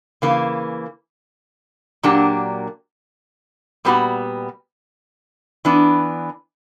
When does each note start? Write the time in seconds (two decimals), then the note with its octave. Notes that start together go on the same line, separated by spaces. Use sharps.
0.22 C#3 E3 A#3
2.03 A#2 F#3 A#3 D4 G4
3.85 A#2 G3 B3 F#4
5.65 E3 B3 D4